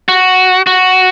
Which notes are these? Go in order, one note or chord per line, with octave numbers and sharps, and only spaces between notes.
F#4
F#4